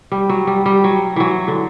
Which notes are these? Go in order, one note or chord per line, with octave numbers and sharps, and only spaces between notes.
G3
F#3
G3
G3
F#3
E3 F#3
D3